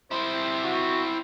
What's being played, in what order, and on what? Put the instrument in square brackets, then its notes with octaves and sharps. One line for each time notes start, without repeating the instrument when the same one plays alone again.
[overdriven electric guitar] C4 E4 [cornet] C5
[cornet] F#4